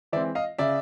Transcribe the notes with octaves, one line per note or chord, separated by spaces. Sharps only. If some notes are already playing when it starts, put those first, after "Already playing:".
E3 G#3 C4 D5 E5
D#5 F5
C#3 D5 E5